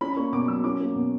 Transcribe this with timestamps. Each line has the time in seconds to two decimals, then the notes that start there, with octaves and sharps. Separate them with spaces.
0.01 C#4 B5
0.11 B5
0.17 A#3 C#6
0.33 B2 D6
0.48 F#3 E6
0.64 C#4 D6
0.80 A#3
0.96 B2